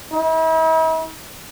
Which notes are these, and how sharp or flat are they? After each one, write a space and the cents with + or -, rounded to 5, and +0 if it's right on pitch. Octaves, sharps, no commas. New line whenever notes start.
E4 -45